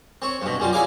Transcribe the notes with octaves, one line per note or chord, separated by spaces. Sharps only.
C4 C#5
G2 B2
F#2 G3 F4
E4 G#4 C#5 F5 G#5 D6